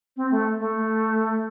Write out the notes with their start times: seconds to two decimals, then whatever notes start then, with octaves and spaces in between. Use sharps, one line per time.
0.17 C4
0.31 A3
0.59 A3